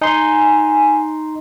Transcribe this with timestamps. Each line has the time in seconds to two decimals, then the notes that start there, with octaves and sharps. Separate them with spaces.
0.01 D#4 G#5 C6